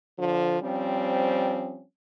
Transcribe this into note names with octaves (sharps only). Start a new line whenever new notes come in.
D3 F3
F3 G3 C4 C#4